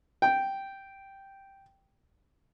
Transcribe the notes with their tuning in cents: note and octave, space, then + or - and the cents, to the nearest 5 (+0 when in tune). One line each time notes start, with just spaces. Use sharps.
G5 -5